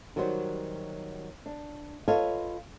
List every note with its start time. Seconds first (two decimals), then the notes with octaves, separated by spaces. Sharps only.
0.16 D#3 F#3 G3 F#4 C5
1.46 D4
2.08 F4 A4 B4 C#5 D#5 F5